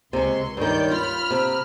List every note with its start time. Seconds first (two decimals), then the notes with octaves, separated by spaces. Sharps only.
0.13 C#2 C3 G#3 C6 C#6
0.57 G2 D#3 C#5 D5 G6
0.91 F4 B5 F6
1.31 C3